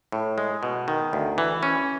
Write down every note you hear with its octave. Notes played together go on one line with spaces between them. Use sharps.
A2
G#3
B2
D#3
D2
E3
C#4